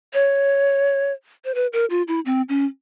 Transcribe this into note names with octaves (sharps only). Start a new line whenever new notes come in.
C#5
C5
B4
A#4
F4
E4
C4
C#4